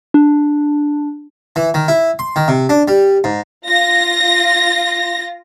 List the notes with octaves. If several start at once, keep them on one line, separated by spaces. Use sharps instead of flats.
D4
E3
D#3
E4
C6
D#3
C3
D4
G3
G#2
F4 A#6